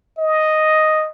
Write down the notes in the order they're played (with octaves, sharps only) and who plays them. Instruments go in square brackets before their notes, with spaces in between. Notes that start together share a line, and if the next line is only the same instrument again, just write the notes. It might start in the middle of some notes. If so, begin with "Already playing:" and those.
[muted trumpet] D#5